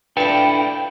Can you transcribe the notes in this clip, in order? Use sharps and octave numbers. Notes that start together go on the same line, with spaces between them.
D4 E4 F4 A4 B4 G5 B5